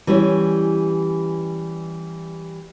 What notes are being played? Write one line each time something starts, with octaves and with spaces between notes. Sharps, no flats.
E3 G3 C#4 C#5